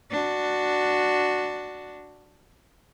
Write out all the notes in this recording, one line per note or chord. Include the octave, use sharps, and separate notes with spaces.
D4 F#4